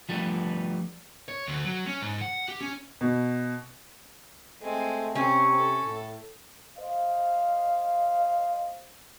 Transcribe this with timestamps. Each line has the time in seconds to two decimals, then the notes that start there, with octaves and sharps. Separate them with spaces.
0.09 F3 G3 A3 B3 D4
1.28 C#5
1.48 D2
1.65 F#3
1.86 C#4
2.01 G#2
2.21 F#5
2.48 G4
2.61 C#4
3.01 B2
4.62 G#3 A3 C4
5.15 C3 C4 C#4
5.54 A4
5.85 A2
6.78 C5 D#5 F5